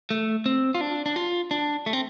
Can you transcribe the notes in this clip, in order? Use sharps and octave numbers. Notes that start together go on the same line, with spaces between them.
A3
C4
F4
D4
D4
F4
D4
A3
C4